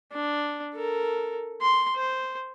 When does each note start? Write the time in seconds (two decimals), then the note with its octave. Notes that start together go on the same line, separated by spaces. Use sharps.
0.12 D4
0.75 A4 A#4
1.62 C6
1.96 C5